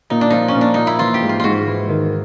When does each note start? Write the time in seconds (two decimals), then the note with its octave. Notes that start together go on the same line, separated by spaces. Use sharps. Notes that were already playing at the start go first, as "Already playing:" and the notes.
0.10 A#2 D#4
0.21 D4
0.30 F3 D#4
0.48 C#4
0.56 A#2
0.61 D4
0.74 F3 D#4
0.87 E4
0.99 E3 F4
1.14 G4
1.22 G#2
1.29 F4
1.40 G#2 F4 F#4
1.67 E3
1.89 D#3